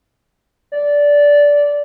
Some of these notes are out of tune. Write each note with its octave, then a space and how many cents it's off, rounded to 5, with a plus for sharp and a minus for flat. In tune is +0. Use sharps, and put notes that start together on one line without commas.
D5 -15